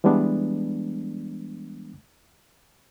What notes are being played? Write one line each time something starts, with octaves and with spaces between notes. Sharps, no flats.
E3 G3 G#3 B3 D4